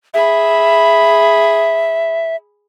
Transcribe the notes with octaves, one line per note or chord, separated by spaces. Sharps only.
G#4 E5 B5